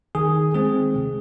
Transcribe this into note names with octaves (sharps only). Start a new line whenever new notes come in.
D#3 G#4
G#3 C4 G#4
C3